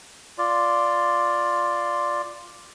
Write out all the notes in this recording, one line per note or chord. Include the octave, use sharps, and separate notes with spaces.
F4 D5